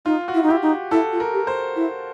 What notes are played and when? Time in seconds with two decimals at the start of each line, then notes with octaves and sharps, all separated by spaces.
0.06 D#4 F4
0.28 F#4
0.34 E4
0.43 D#4
0.48 E4 G4
0.63 D#4
0.91 E4 A4
1.13 F4
1.20 A#4
1.33 G4
1.47 C5
1.76 E4